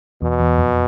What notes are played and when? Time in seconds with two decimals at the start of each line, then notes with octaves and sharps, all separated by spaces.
0.22 E2 B2
0.40 E2
0.58 F2